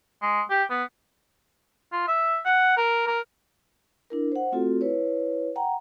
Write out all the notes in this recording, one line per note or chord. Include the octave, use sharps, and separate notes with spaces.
G#3
G4
B3
F4
E5
F#5
A#4
A#4
D4 E4 A#4
C5 F#5
A3 C4 F4 F#4 A4
E4 B4 C#5
F#5 G5 A#5